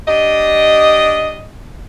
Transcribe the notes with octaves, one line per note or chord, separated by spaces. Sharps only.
D4 G4 D#5